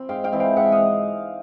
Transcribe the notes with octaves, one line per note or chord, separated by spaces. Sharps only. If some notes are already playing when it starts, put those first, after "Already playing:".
Already playing: C4
G#2 F5 G5
F5 G5
E3 G#3 C4
F5 G5
G#2 E5 F#5
D#5 F5